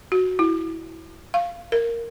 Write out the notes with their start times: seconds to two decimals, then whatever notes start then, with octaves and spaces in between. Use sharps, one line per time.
0.12 F#4
0.39 E4
1.34 F5
1.72 A#4